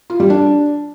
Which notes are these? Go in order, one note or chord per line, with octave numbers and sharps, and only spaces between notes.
F4
G3
D4